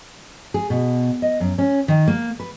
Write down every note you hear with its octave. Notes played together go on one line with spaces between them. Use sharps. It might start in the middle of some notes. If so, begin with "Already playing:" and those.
G#4
B2
D#5
F#2
C#4
D#3
A#3
B4